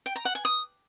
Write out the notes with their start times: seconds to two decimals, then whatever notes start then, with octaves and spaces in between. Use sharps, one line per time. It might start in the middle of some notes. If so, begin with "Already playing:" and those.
0.06 G5
0.16 A#5
0.25 F#5
0.35 G#5
0.45 D#6